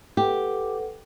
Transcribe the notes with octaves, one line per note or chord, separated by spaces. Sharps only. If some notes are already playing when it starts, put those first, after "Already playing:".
G4 A4 B4 F#5